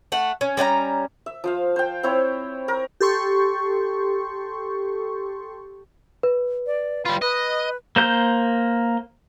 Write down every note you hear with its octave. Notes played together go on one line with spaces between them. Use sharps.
A3 F#5
C#4
G3 C#4 F#5 A#5
E5
F3 C5 F5
C5 G5
C4 E4 C5 C#5
A#4
G4 A4 C6 C#6
B4
D5
G3 F4 B5
B4 D#5
A#3 C5 G6